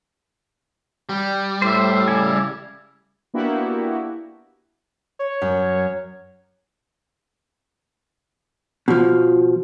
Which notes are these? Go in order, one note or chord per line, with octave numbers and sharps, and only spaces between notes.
G3
A2 C5 E5
C#3 E4 G#5
A#3 B3 D4 E4 F#4 G4
C#5
F#2
B2 F3